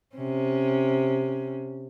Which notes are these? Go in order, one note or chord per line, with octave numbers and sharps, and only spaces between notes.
C3 C#4